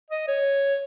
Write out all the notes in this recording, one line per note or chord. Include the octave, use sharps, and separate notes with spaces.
D#5
C#5